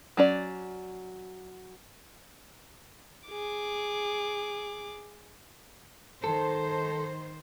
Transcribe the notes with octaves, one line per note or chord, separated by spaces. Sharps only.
F#3 C#4 D5
G#4 D6
D#3 A4 C5